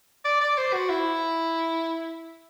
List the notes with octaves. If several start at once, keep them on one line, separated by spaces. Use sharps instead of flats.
D5
D5
C5
F#4
E4